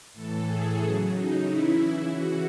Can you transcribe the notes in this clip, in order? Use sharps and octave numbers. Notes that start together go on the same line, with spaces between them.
A2 E3 A4
G#4
C#3 F#3
D#4
C#3 E3 E4
C#3 E3 F#4